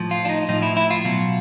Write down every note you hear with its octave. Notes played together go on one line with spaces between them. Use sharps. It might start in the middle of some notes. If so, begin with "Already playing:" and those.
Already playing: A2 F3
F4
D4
D#4
A2 F3 D#4
E4
E4
F4
B2 F#3